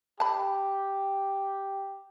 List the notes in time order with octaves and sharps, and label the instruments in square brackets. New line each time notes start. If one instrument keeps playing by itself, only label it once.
[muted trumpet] G4 [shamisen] A5 B5